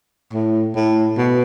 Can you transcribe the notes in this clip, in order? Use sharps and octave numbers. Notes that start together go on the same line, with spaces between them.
A2
A2
B2